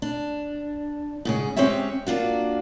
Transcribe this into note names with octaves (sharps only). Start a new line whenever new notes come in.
D4
G#2 C#3 G#4
G#3 C4 C#4 G4 C#5 E5
A#3 D4 F4 F#4